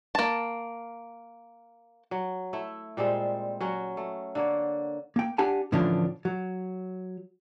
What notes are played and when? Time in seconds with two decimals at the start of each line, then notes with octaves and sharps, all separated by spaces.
0.15 A#3 A5
2.11 F#3
2.53 A3 E4 E5
2.97 A#2 G3 G#3 C4
3.61 F#3 C#4 F#4
3.97 A3
4.35 D3 A#3 C#5
5.16 A#3 G5
5.38 D4 G4 F#5 G#5 A5
5.72 A2 D3 E3 F3 C#4 D4
6.25 F#3